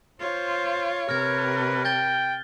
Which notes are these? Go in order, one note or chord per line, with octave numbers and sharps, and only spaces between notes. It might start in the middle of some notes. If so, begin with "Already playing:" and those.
F4 C5 C#5
C3 A#4 B4 F6 G#6
G5 G6 A6 G7